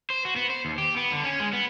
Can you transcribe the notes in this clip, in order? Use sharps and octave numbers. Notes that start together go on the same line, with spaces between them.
C5
F#4
B3
C5
D#2
G4
B3
D3
C#4
G#3
B3